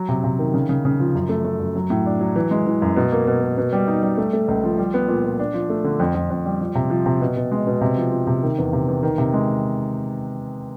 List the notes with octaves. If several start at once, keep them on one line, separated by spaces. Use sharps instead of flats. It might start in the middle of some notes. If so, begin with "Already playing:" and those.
Already playing: F#3
C3
C3
D#3
C#3
C#3
C#3
F3
F#2
A3
A3
F#2
F#3
A2
D4
F#3
E3
G#3
E3
F#2
B2
A#3
B2
A#3
B2
G3
D#4
G3
A3
A3
C#2
F3
G3
B3
A#2
A#2
D4
F3
A3
D3
F2
F2
F2
G3
F3
C3
F3
C3
B2
B2
G#3
B2
C3
F3
F3
C3
D#3
E2
C3
E2
D#3
C3
G#3